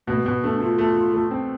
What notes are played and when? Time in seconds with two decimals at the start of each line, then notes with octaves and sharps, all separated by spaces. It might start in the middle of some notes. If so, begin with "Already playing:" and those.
0.07 B2 A3
0.20 A3
0.25 B2 B3
0.43 A3 D4
0.60 A3 F4
0.78 A3
0.96 A3
1.14 A3
1.31 C4